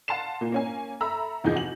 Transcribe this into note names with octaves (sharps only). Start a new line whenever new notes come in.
F5 F#5 A5 C6 C7 E7
A#2 A#3
A#3 C#4 G#5
A4 E5 A#5 B5 E6
F1 E2 F3 D#4 G#4 G6
F#4 F#7